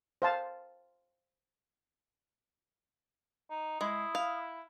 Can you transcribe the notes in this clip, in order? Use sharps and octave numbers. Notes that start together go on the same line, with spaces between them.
C5 F5 A5
D#4
G#3 E4 D#6
F5